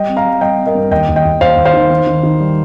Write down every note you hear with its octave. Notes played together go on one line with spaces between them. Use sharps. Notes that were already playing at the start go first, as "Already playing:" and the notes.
Already playing: G3 D#5 G5
C4
F5 A#5
G3
G3 D#5 G5
C4
A#4 D#5
G2
D#2 D#5 G5
D#2
D#5 G5
D#2
D#2 C5 F5
D#2
C5 F5
D#3
D#3
D#3
D#3
G3